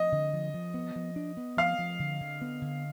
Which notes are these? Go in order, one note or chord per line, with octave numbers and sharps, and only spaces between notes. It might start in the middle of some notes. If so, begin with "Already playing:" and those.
Already playing: F3 D#5
D3
F3
F3
B3
F3
D4
B3
F3 F5
F3
D3
D3
B3
D3